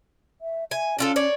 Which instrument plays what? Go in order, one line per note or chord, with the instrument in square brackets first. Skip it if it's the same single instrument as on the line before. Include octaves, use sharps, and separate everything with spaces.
[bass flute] E5
[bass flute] E5 [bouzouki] G#5
[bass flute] C#4 [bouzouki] D4 F4 A4
[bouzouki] C#5 D5